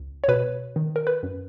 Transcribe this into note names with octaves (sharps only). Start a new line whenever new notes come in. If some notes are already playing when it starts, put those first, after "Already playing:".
Already playing: C#2
C#5
B2 B4
D#3
A#4
B4
F#2